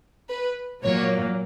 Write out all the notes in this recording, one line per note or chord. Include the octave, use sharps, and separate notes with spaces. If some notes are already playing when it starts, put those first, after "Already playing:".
B4
A#2 F#3 A#3 C#5